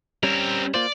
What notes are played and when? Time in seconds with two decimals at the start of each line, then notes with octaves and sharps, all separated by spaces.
0.23 G3 C4 C#4 A#4
0.74 A#3 F4 C5 D5